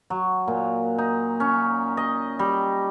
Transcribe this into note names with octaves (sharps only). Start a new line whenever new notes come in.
F#3
A#2
D#4
C#4
D#5
G3